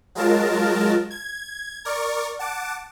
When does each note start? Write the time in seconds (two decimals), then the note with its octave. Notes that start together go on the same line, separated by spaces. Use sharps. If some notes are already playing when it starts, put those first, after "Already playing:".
0.15 F#3 G#3 F4 A#4 A5
1.10 G#6
1.85 A#4 D5 C#6
2.39 F#5 A5 D6